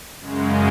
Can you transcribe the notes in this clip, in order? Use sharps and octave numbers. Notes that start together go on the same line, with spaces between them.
F#2 C#3 G#3